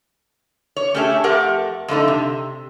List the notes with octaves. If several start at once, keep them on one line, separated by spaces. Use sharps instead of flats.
C#5
A3 C#4 G4 G#4 C#5 E5
F2 A3 G4 A#4 F#5
F2 D3 A3 D#4
C3